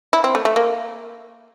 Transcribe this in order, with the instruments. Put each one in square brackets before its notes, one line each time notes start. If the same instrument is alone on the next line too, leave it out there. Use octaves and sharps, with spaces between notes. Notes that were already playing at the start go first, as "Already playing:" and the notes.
[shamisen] E4
C4
A3
A3
A#3